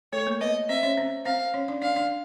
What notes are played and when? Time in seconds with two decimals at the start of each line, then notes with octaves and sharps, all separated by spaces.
0.13 A3 A4 C#5
0.27 A#3 A#4
0.41 B3 B4 D#5
0.69 C4 C5 E5
0.83 C#4 C#5
0.97 C4 C5
1.25 C4 C5 F5
1.54 C#4 C#5
1.68 D4 D5
1.82 D4 D5 F5
1.96 D4 D5